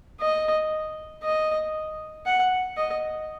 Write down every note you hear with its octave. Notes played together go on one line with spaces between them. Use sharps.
D#5
D#5
F#5
D#5